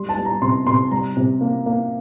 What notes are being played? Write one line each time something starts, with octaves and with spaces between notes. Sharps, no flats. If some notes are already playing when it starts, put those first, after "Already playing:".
Already playing: G3 C6
A5
G3
A#5
C3 C6
C3 C6
G3 A#5
C3
A#3
A#3